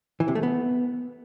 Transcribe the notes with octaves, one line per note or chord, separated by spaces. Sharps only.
E3
C3
A3
B3